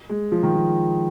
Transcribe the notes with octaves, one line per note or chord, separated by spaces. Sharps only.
G#3
F3
D#3
F3